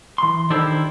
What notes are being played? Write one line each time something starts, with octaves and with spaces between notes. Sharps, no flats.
E3 C6
D#3 D4 E4 G4 A4 C5